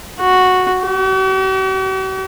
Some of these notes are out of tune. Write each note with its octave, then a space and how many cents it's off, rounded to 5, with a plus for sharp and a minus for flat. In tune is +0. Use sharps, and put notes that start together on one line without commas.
F#4 -5
F#4 +45